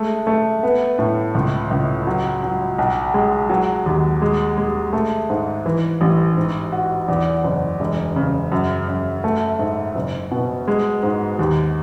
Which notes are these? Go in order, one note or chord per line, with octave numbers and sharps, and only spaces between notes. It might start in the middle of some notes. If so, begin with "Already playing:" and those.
Already playing: G#3 A3
A3
B3
A2
C#2
C#2
F#3
F#3
B1
G#3
F#3
D#2
G#3
G#3
A3
G#2
E3
A1
G#2
F#4
E2
F#1
E1
C#3
F#2
F#2
A3
G#2
F#1
B2
G#3
G#2
D#2